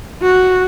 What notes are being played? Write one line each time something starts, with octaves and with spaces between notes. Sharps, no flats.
F#4